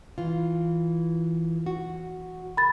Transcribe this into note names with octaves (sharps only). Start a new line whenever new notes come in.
E3 F4
F#4
B5 A6